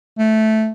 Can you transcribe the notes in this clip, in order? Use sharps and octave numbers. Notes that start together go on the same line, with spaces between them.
A3